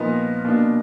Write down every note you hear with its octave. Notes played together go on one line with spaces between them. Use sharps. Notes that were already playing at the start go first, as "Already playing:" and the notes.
Already playing: A#2 F3 B3 D#4 A#4
B2 A#3 D4